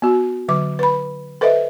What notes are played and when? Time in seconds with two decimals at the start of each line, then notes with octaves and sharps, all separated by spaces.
0.02 B3 F#4
0.48 D3 F#3 D6
0.79 B4 B5
1.41 A4 B4 C5 D#5 E5